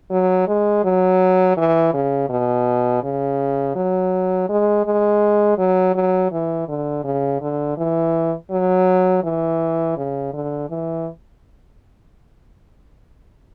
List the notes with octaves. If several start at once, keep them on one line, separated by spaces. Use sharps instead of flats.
F#3
G#3
F#3
E3
C#3
B2
C#3
F#3
G#3
G#3
F#3
F#3
E3
D3
C#3
D3
E3
F#3
E3
C#3
D3
E3